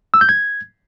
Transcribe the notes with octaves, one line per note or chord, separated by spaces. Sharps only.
E6
G6
G#6